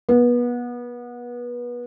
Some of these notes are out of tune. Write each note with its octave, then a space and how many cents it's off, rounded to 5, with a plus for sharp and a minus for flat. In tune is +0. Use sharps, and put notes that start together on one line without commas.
B3 -25